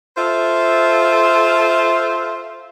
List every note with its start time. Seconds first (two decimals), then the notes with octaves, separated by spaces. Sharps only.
0.17 F4 A4 C5 E5